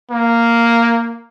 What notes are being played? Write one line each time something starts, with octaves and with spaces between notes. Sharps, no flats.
A#3